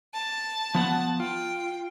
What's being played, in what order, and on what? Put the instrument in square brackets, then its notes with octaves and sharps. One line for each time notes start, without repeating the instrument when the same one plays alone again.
[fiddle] A5
[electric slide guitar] F3 B3 F#5
[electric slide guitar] F4 [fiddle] G5